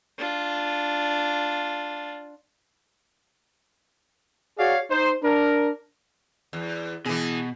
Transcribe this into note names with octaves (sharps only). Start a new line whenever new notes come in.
D4 F4
F#4 G#4 C#5 D5 F5
D#4 C5
D4 A#4
E2
B2 E3 G#4